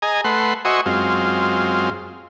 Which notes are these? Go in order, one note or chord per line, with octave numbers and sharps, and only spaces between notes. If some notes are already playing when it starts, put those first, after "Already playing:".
G#4 D#5 G#5 A#5
A3 B4 F#5 C6
F#4 C5 D#5 E5 G#5 C#6
F#2 G#3 C4 F4